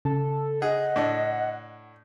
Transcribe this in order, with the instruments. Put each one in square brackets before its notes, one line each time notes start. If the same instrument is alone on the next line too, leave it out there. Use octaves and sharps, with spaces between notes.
[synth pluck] C#3 [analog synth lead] A4
[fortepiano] G#4 [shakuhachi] D#5 [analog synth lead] F#5
[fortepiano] A2 D4